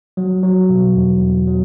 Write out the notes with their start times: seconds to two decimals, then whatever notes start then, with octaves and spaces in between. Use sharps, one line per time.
0.17 F#3
0.43 F#3
0.69 B2
0.96 E2
1.22 E2
1.47 F#3